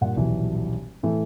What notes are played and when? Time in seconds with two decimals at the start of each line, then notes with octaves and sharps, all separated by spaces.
0.01 G2 A#2 F#5
0.17 D#1 B1 E3 F#3
1.03 A2 E3 A3